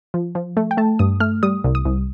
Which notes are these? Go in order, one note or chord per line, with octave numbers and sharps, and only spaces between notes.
F3
F3
A3
G5
A3 A5
G2 D#6
A3 F6
G3 D#6
C2
D#6
C2